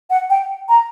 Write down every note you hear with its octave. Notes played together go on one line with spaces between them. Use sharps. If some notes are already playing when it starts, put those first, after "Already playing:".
F#5
G5
A#5